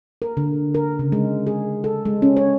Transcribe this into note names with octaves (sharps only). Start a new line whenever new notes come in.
A#4
D3
A#4
C#3
G#3
G#4
A4
G#3
C#4
C#5